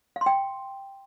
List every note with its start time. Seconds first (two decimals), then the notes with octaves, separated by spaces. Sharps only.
0.16 F5
0.21 C6
0.26 G5